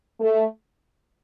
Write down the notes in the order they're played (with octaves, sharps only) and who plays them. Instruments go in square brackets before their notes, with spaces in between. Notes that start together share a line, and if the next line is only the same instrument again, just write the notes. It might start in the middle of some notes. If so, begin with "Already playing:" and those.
[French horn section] A3